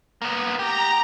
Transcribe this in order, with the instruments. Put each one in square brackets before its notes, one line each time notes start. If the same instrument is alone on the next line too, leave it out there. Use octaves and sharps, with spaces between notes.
[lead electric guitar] A#3 B3
[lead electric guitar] G4 [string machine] A#5